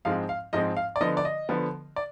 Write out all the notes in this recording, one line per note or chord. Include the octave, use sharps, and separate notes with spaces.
G#2 F3 G#3 C4 F5
F5
G#2 F3 G#3 C4 D#5
F5
D5
D3 F3 B3 D#5
D5
D#5
D3 F3 B3
D5